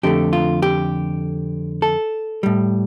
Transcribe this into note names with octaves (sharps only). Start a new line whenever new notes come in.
F2 D3 A3 G4
F4
G4
A4
A2 G3